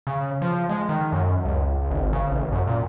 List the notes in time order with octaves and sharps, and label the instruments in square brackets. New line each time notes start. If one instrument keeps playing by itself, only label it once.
[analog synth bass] C#3
F3
G#3
D#3
F#2
C#2
G#1
C#3
A1
F#2
A#2